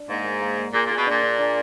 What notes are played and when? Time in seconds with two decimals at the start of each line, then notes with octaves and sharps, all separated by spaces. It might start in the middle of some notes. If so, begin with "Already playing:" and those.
Already playing: D4
0.09 G#2 A#3
0.25 A#3
0.41 A#3
0.58 A#3
0.73 A#2 G#4
0.86 A#2 G#4
0.98 B2
1.06 A#2 D4
1.23 D4
1.39 D4